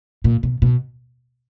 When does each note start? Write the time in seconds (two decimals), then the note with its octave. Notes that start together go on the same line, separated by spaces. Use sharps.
0.24 A#2
0.43 B2
0.62 B2